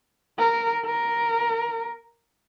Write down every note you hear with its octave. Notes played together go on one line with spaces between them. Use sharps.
A#4
A#4